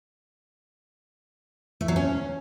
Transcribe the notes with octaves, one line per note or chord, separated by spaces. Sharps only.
A3
F#3
C#4